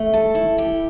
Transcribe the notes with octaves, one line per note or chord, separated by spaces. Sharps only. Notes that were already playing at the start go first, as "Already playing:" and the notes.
Already playing: A3
A4
E4
G4